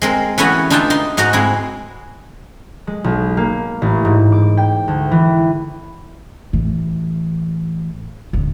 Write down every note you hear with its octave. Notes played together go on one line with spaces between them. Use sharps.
G#3 C4 A#4
E3 A3 B3 C#4 E4 F#4
D4 D#4 F4 E5 G5 A5
D#4 C6
G#2 D#4 F#4 D#5 A#5
G#3 C4 E4
G#3
B1
A#3
A1
G#2
D6
G5
D2
E3
A1 E3
D#1 D3